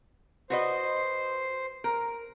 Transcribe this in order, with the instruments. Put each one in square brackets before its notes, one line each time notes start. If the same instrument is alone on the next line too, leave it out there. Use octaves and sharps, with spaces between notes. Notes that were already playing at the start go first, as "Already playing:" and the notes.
[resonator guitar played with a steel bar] F#4 B4 D#5 [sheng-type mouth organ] C5
[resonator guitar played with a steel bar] A#4